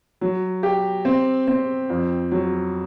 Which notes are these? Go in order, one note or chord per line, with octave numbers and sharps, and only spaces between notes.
F#3
G4
C4
C4
F2
F#3